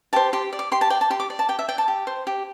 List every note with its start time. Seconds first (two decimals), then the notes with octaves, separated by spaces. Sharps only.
0.13 G4 C5 A5
0.33 G4 C6
0.53 D5
0.59 D6
0.72 G4 C6
0.81 A5
0.90 D5 G5
1.01 A5
1.10 G4 C6
1.20 D6
1.30 D5
1.39 A5
1.49 G4 G5
1.59 E5
1.69 D5 G5
1.78 A5
1.88 G4
2.07 C5
2.27 G4